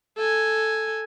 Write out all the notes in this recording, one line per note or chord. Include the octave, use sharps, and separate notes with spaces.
A4 G#5